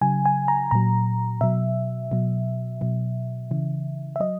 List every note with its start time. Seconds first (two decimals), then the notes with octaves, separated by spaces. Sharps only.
0.01 C#3 F#3 G#5
0.26 G#5
0.48 A#5
0.71 A#2 F#3 A#5
1.41 B2 F#3 E5
2.12 B2 F#3
2.81 B2 F#3
3.51 C#3 E3
4.16 E5
4.20 F#3 D#5